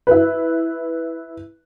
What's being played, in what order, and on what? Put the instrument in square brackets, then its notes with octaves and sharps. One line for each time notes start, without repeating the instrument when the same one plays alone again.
[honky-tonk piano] E4 B4